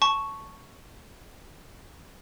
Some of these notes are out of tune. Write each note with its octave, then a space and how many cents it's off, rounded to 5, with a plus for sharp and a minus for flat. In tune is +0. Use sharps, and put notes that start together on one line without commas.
A5 +0 C#6 +0